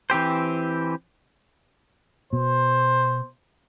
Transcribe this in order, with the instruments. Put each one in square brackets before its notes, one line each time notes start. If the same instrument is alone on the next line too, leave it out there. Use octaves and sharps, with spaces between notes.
[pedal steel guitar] E3 C4 G4 C5
[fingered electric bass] B2 [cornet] C5